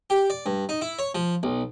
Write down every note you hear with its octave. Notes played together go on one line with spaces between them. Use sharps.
G4
D5
G2
D#4
E4
C#5
F3
B1